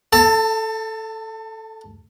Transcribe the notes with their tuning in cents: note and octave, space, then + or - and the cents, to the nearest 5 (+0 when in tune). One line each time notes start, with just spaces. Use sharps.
A4 +0 A5 +30